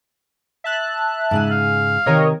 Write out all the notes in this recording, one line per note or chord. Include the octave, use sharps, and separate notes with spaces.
E5 A5 F#6
G#2 C#3 G#5
F5
C3 D#3 A#4 C#5 D#5